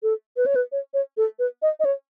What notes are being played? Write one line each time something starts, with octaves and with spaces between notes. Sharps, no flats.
A4
B4
C#5
B4
C#5
C#5
A4
B4
D#5
D#5
C#5